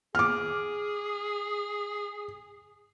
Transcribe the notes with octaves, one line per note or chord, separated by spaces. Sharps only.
G#4 D6 F6